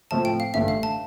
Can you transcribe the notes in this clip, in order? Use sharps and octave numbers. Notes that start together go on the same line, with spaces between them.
A2 F3 A3 C4 A5
G5
F5
A1 G2 D3 A3 E5
F5
A5